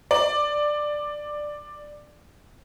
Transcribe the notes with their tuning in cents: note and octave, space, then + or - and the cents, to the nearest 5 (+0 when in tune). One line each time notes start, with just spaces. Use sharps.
D5 +10